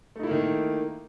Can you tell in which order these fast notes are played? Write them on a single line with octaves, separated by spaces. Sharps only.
A3 D#4 E4 A#3 D#3